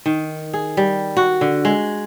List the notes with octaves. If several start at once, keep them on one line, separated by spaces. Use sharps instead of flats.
D#3
G#4
G3
F#4
D3
G#3